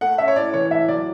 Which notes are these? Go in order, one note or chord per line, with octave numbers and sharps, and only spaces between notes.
A3 F#5
C#4 E5
C#5
A2 D5
E3 C#5
A2 E5
F#3 D5